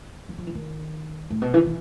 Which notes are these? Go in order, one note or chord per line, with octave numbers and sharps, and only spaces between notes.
E3
F3
E3
D#3
A2
B2
E3
E3